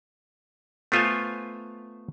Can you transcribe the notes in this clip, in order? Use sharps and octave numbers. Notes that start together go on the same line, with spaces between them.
A3 B3 F4 C5 F5 G#5